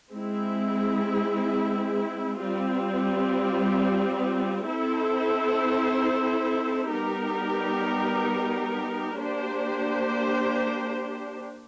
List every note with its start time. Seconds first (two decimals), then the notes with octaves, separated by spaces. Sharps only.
0.12 G#3 C4 E4
2.38 G3 C4 F4
4.64 C4 E4 A4 C5
6.89 G3 B3 D#4 G4 A#4
9.15 A#3 D4 G4 C5